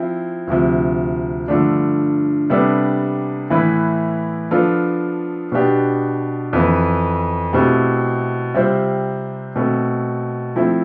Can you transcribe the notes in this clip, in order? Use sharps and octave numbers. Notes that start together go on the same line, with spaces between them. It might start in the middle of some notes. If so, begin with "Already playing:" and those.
Already playing: F3 C4 E4
D2 C3 F3
G2 D3 F3 A3 D4
C3 G3 B3 D4 A4
A2 E3 B3 E4 B4
F3 B3 D4 F4 A4
B2 B3 D4 G4
F2 E3 B3
B2 A3 C4 E4 G4
C3 G3 C4 F4 C5
B2 A3 C4
F3 A3 C4 E4